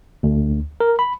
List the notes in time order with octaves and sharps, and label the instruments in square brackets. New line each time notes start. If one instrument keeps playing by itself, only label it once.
[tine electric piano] D2
A#4
B5